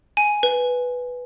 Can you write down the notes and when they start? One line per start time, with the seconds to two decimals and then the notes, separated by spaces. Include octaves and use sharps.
0.17 G#5
0.43 B4